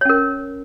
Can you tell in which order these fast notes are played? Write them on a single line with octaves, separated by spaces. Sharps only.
C#5 C#4 A#4